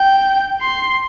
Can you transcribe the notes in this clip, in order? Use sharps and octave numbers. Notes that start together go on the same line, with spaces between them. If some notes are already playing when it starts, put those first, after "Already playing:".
Already playing: G5
C6